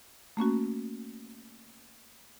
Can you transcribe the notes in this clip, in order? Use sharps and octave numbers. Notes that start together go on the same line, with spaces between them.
A3 A#3 C#4 F#4